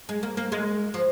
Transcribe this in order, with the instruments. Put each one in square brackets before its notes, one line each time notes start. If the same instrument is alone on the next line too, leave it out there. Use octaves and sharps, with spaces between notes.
[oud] G#3
A#3
A#3
G#3
F3